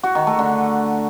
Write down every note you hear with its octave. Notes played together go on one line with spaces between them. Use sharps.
F#4
D#3
A3
D3